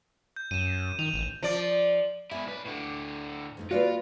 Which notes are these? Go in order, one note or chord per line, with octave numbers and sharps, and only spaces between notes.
G6
F#2 D#7 E7
D#3 F7
A1
F3 D5
B2 E4 D5 G#5
B1 B4
A2 D3
F2 A3 D#4
G#3 A#3 F4 F#4 B4 C#5 D5